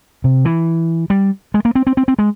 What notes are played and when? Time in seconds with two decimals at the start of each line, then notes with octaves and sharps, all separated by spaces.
0.24 C3
0.45 E3
1.10 G3
1.54 G#3
1.65 A#3
1.75 C4
1.87 C4
1.97 C4
2.08 C4
2.19 G#3